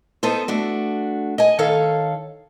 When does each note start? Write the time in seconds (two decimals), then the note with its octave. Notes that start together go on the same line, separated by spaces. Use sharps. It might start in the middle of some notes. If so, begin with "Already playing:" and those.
0.23 B3 D#4 A4 C5
0.48 A3 D4 F#4
1.38 D#5 G#5
1.59 D#3 A4 C#5 F5